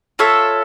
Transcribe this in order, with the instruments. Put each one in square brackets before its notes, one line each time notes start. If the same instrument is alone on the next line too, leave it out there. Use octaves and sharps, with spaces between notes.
[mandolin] F4 A4 C#5 E5